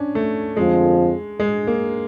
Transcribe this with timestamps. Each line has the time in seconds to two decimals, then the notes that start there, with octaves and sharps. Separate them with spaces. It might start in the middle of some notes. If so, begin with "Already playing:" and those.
Already playing: C#4 D4
0.15 A3
0.57 F2 D3 F3 G#3
1.40 G#3
1.67 A#3